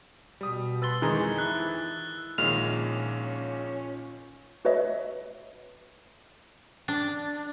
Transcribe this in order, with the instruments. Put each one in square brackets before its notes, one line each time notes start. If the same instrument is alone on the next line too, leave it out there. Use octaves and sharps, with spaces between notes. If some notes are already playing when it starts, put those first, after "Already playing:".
[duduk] B2 [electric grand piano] G3 D#6
[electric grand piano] B4 C6 [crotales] E6 A6 G7
[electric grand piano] F2 E3 [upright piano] D#3 G#4 A#5 [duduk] G#3
[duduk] E4 [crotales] F#6
[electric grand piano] A#1 G#3 F6 [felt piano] A#2 D#3 [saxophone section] C#4 [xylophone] F7
[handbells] F#4 B4 C#5 D#5 E5
[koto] D4